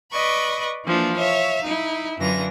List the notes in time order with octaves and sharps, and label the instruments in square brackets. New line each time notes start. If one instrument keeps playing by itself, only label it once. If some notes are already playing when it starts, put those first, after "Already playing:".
[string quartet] B4 D5 D#5 B5 C#6
E3 F3 A#3 D4
C#5 E5 F5
D#4 E4
F#2 D3 E3 F4 A#6